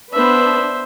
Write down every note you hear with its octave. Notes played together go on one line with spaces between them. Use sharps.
B3 D4 B4 C5 E5